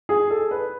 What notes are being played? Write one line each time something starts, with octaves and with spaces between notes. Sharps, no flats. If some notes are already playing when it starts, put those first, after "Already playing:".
G#4
A4
B4